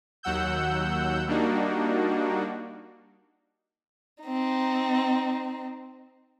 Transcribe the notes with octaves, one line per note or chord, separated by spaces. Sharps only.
D#2 F#3 F#5 E6 G6
G3 A#3 D4 D#4 F#4
C4 D#4